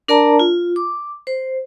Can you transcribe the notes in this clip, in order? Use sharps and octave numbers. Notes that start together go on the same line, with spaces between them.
D4 A#4 D5 A5 A#5
F4
D6
C5